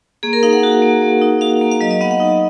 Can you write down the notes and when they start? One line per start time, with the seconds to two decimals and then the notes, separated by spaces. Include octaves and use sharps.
0.23 A#3 G#4
0.33 A#4
0.43 D#4 F5
0.53 F#5
0.63 F#4
0.82 A#3
1.02 A#3
1.21 D#4
1.41 F#4 F5
1.61 A#3
1.72 F5
1.81 F#3 D#5
1.91 D#5
2.01 B3 F#5
2.11 F#5
2.20 D#4